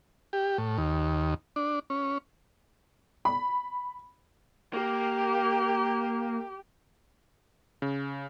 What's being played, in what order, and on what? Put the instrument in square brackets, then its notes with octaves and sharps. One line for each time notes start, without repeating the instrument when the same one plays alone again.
[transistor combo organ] G4
A2
D#2
D4
C#4
[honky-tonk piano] B5
[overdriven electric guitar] A#3 [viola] G4
[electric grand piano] C#3